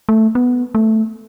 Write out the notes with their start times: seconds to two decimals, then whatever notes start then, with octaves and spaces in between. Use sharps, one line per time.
0.09 A3
0.35 B3
0.75 A3